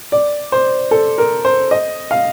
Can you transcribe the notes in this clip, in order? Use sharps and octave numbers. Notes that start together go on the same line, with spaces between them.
D5
C5
A4
A#4
C5
D#5
F5